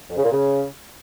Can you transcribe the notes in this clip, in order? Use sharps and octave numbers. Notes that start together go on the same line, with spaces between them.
F2
C#3
A#2
C#3